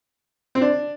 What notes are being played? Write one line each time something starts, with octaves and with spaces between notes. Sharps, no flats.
C4
D4